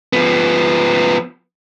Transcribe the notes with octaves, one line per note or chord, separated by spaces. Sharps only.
F3 B3